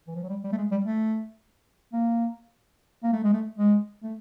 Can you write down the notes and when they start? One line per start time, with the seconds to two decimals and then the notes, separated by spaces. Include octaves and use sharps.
0.07 E3
0.15 F3
0.23 F#3
0.29 G3
0.44 G3
0.52 A3
0.58 G#3
0.71 G3
0.85 A3
1.93 A#3
3.03 A#3
3.13 A3
3.24 G#3
3.33 A3
3.58 G#3
4.03 A3